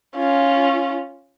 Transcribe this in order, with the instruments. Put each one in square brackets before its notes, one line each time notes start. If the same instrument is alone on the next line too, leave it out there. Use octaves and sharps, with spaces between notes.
[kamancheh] C#4 F4